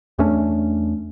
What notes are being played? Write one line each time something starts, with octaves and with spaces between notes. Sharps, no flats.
E2 A3 C#4 D4